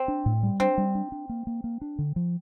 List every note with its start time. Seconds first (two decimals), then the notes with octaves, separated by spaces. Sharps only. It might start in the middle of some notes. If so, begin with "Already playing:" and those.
Already playing: C4
0.08 D4
0.26 A2
0.43 G3
0.60 C4 D4
0.78 G3
0.95 D4
1.12 D4
1.29 A#3
1.47 A#3
1.64 A#3
1.81 D4
1.99 D3
2.16 F3